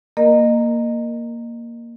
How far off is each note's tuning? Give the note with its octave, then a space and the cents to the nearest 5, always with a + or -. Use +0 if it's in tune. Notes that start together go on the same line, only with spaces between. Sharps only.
A#3 +0 A#4 +0 D#5 -25